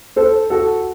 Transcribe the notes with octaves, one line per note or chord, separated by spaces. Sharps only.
A4 C5
F#4 A4